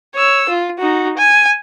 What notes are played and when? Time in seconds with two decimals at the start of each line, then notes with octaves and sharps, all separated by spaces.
0.16 C#5 E6
0.50 F4
0.79 D#4 F#4
1.18 G#5